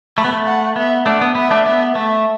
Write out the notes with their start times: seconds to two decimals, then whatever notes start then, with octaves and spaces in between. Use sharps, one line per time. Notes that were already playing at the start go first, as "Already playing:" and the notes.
0.18 A3 B5
0.25 B3
0.33 A3
0.47 F#5
0.76 B3 E5
1.06 A3 D4 F#5
1.21 B3
1.35 B3 E5
1.51 A3 D4
1.66 B3 E5
1.95 A3 E5